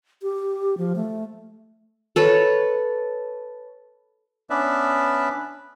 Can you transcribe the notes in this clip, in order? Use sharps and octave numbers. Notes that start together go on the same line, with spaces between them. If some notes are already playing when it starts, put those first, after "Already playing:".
G4
F3
A3
A4 B4 C#5
B3 C#4 D4 B4 D5 E5